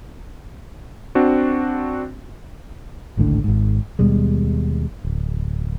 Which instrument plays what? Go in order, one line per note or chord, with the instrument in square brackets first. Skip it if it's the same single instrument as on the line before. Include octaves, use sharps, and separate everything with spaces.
[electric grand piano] C4 D4 F#4
[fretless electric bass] G#1 C#2 A2 D3
G#1 G#2
D#2 B2 G3 G#3
D1